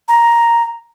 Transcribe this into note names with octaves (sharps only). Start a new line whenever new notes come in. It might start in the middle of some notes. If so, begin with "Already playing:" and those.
A#5